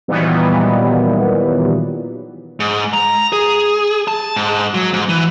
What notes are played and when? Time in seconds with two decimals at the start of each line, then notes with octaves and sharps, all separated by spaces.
0.08 A#2 D#3 E3 F#3 G3 B3
2.60 G#2
2.93 A#5
3.33 G#4
4.08 A5
4.36 G#2
4.74 F#3
4.93 G#2
5.09 E3